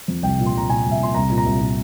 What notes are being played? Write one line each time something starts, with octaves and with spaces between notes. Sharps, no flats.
F2
C2 G5
A#2
C6
C2 A#5
A#2 G#5
C2
E5
A#2 C6
C2 A#5
A#2
A#5
C2
A#2